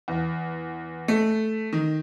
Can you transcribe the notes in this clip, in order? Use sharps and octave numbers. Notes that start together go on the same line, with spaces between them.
E2
A3
D#3